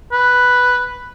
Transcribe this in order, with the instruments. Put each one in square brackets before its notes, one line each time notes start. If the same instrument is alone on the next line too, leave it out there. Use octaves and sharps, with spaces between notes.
[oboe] B4